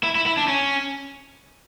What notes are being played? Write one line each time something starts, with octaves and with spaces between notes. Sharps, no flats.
E4
E4
E4
D4
C#4